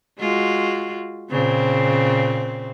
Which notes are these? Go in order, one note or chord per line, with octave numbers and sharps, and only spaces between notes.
G#3 F4 F#4
A#2 C#3 C4